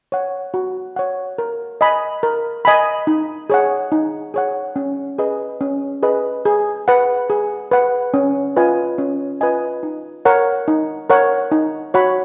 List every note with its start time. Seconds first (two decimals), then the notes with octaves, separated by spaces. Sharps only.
0.12 C#5 F#5
0.54 F#4
0.96 C#5 F#5
1.38 A#4
1.81 D#5 G#5 B5
2.23 A#4
2.65 D#5 G#5 B5
3.07 D#4
3.50 G#4 C#5 F#5
3.92 D#4
4.34 G#4 C#5 F#5
4.76 C#4
5.18 G#4 B4 D#5
5.61 C#4
6.03 G#4 B4 D#5
6.45 G#4
6.88 B4 F#5
7.30 G#4
7.71 B4 F#5
8.14 C#4
8.56 F4 B4 D#5 G#5
8.98 C#4
9.41 F4 B4 D#5 G#5
9.83 D#4
10.25 A#4 C#5 F#5
10.68 D#4
11.10 A#4 C#5 F#5
11.52 D#4
11.94 F#4 C#5 F#5 B5